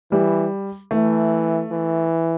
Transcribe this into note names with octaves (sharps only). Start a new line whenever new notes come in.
E3 G3
E3 A3
E3